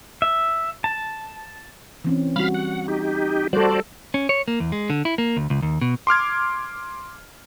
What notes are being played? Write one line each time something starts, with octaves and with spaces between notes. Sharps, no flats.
E5
A5
E3 C4 C#4
G3 F#4 F5 B5 F6
F#5
D#4 G4
G3 F#4 A4 C5 D5
C#4
C#5
A#3
E2
G#3
D3
E4
A#3
D2
C#2
D#2
B2
C6 D6 F6 G#6